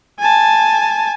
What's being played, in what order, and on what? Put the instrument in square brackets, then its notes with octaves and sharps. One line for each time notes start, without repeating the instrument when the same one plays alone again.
[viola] G#5 A5